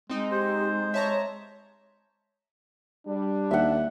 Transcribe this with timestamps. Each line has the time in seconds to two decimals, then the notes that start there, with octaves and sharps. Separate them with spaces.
0.10 G#3 C4 D#4
0.31 G4 C5
0.94 C#5 E5 A5 A#5
3.07 G3 D4
3.51 D#2 E5 F#5